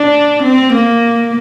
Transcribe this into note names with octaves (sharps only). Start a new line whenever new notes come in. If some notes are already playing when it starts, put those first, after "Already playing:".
Already playing: D4
C4
A#3